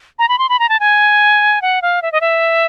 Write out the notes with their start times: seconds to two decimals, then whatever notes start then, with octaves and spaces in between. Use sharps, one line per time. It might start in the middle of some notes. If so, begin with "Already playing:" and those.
0.19 A#5
0.29 B5
0.39 C6
0.49 B5
0.59 A#5
0.69 A5
0.80 G#5
1.62 F#5
1.82 F5
2.02 E5
2.12 D#5
2.21 E5